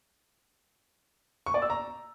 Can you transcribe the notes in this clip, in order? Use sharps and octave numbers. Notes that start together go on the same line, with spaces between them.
C#6
D5
E6
A#5